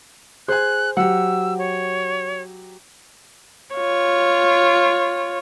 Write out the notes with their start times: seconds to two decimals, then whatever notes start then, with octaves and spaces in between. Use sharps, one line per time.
0.48 G#4 C5 G#5 F#6
0.97 F#3 G4 F#5 E6
1.59 C#5
3.75 F4 C#5